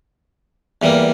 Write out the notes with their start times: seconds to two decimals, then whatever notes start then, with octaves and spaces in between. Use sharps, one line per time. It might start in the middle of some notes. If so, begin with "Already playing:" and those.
0.82 E2 E3 G3 A#3